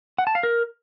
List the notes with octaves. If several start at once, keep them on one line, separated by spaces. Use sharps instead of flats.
F#5
A5
F5
A#4